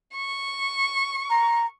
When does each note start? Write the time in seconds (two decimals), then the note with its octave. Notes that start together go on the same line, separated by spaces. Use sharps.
0.16 C#6
1.30 A#5